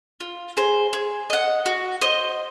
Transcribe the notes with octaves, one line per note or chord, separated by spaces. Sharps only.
F4
G#4 C5
G#4
D#5 F#5
F#4
C5 D#5